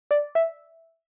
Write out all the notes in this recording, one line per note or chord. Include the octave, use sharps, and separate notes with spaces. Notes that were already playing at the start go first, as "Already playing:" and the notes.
D5
E5